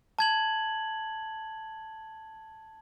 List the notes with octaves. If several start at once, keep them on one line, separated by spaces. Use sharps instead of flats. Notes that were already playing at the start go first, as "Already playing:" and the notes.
A5 G#6 F#7